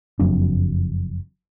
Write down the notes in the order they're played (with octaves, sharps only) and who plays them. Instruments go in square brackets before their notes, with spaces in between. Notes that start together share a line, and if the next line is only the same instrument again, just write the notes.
[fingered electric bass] F#1 F2 F#3 D4